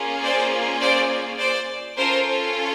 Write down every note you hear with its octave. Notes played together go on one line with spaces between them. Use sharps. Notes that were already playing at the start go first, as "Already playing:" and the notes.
Already playing: A#3 C#4 F4 G#4
C5 D5
C5 D5
C5 D5
C#4 F4 A4 A#4 C5